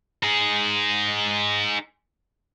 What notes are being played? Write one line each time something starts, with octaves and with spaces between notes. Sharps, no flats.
D#4 G#4